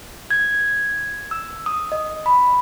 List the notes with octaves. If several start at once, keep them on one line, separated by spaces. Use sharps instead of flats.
G#6
E6
D#6
D#5
B5